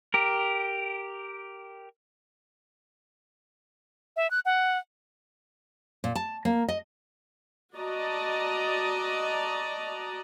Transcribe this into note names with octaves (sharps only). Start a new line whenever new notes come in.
G4 A#4
E5
F#6
F#5
A#2
A5
A#3
D#5
F#4 D5 D#5 A5 A#5